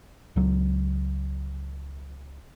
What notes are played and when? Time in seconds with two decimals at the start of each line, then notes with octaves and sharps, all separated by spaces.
0.36 C#2 F#3